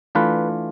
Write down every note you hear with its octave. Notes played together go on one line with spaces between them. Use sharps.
E3 A3 D4 F4 B4